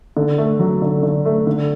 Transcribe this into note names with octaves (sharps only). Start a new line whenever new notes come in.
D3
A3
F#3
D3
D3
A3
D3